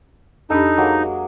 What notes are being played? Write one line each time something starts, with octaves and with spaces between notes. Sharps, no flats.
F2 D4 D#4 G4 A4 D#5 B5
F#3 G#3 A#3